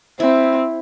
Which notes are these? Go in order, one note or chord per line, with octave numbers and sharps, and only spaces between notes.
C4 E4